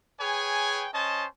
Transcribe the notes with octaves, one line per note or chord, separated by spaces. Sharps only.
G#4 B4 C#5 G5 G#5
C#4 C5 D#5 A5